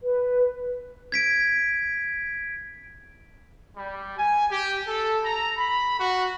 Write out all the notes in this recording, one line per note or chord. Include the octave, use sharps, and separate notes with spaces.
B4
G#6 B6 D7
G3
G#5
G4
A4
A#5
B5
F#4